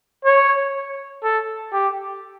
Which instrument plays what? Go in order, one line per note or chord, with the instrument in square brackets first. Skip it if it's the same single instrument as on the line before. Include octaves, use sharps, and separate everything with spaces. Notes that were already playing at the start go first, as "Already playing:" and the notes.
[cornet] C#5
A4
G4